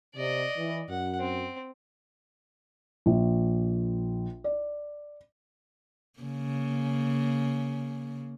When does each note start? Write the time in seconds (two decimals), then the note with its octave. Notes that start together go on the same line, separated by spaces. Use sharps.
0.15 C3 D5 D#5
0.57 E3
0.89 F#2 F#5
1.19 C4
3.06 A#1
4.44 D5
6.20 C#3 A#3